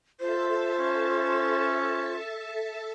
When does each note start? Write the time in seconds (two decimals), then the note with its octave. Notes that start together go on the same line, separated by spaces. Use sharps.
0.20 F4 A4 C5 E5 A5
0.79 C#4